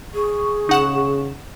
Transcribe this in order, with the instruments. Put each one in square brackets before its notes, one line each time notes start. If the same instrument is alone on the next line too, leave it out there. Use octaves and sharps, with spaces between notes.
[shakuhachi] G#4 [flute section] C#6
[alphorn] C#3 [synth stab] D#4 F#5 E7